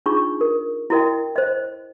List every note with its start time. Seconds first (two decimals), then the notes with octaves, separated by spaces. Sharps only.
0.06 D4 D#4 F4 G#4 C#6
0.41 A#4
0.90 E4 F#4 A#4 D#5 G5
1.36 C5 D#5